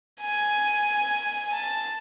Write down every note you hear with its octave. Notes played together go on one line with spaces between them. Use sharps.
G#5
A5